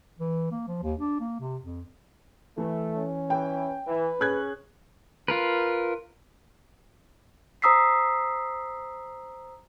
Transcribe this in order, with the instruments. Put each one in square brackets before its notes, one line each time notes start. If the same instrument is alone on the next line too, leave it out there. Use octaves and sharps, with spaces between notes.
[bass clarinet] E3
A#3
F3
D#2
D4
A#3
C3
F2
[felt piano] E3 [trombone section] A3
[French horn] C#4
[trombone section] E3 B4 [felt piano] G5
[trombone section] E3 [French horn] B4
[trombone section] C#4 [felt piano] G#4 F#6 G#6
[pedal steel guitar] F4 A#4 B4
[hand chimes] C5 A#5 D#6 E6 B6 C7